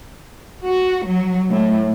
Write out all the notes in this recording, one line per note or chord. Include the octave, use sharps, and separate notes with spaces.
F#4
F#3
A2